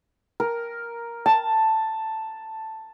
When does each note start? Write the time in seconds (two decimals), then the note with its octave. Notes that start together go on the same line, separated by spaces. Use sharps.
0.40 A#4
1.26 A5